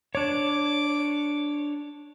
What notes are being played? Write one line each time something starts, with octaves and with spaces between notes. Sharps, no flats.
D4 C#5 D6